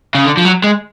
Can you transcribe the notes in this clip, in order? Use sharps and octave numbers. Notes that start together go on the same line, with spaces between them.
C#3
D3
F3
F#3
G#3